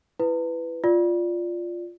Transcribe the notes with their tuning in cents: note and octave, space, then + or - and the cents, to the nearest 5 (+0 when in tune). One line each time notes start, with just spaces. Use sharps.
E4 +15 B4 +10
F4 +0 D5 +0